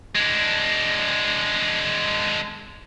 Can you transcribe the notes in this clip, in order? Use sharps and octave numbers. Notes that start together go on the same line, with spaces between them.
G#3 D4